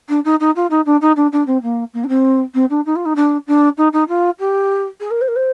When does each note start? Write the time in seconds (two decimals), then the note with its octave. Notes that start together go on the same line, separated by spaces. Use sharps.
0.09 D4
0.25 D#4
0.40 D#4
0.56 F4
0.70 D#4
0.86 D4
1.01 D#4
1.16 D4
1.32 D4
1.47 C4
1.63 A#3
1.94 A#3
2.04 D4
2.09 C4
2.54 C4
2.70 D4
2.86 D#4
2.96 F4
3.06 D#4
3.16 D4
3.47 D4
3.78 D#4
3.93 D#4
4.09 F4
4.39 G4
5.00 G#4
5.11 A#4
5.21 C5
5.28 A#4
5.36 C5